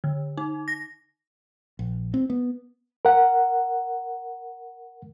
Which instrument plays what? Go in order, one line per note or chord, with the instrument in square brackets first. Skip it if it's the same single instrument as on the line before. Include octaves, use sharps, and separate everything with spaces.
[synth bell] D3
D#4
A#6
[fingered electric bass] A#1
C4
B3
[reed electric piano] A#4 F#5